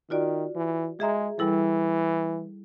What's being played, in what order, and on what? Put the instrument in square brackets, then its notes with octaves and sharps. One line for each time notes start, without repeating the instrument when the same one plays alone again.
[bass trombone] D#3 [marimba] F4 F#4 D5
[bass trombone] E3
[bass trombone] G#3 [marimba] G#4 E5 A#5
[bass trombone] E3 [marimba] G3 E4 A4